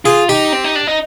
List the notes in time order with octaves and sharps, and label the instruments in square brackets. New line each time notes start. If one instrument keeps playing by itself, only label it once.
[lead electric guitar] F4 [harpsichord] G#4
[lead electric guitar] D#4 [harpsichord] G4
[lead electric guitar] C4
D#4
D4
D#4